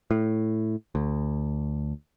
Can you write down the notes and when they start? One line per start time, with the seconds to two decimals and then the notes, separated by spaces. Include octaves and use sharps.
0.11 A2
0.95 D2